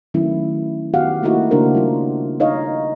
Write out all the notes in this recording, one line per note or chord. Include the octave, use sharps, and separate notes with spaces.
D#3 F#3 A3 C#4 E4
D#3 B3 F#4 G4 F5 F#5
A3 A#3 D#4 E4 F#4
C#3 A#3 D4 A#4 C5
G3 F4
D#4 C#5 D#5 F5